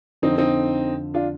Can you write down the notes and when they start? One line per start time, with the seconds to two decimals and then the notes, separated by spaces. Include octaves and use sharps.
0.22 F2 D3 F3 C4 D#4
0.38 C4 D#4
1.14 D4 F4